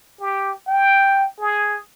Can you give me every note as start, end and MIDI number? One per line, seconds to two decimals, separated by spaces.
0.20 0.52 67
0.67 1.26 79
1.40 1.77 68